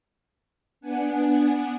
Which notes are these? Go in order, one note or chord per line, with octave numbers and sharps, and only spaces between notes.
B3 D4 F#5 G#5